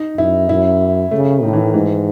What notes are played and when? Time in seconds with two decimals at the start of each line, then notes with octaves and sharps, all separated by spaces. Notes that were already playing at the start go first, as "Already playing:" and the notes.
Already playing: D#4
0.18 F#2 E4
0.49 F#2 E4
1.11 C#3 A3
1.43 A2 D#3
1.53 E3
1.63 D#3
1.74 G#2 E3